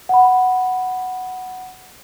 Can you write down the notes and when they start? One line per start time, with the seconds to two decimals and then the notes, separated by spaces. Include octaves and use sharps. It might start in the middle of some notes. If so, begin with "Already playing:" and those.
0.09 F#5 B5